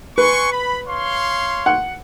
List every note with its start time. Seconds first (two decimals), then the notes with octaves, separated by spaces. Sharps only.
0.18 B4 G#5 C6 C#6
0.51 B5
0.87 C#5 F5 C6
1.66 F#5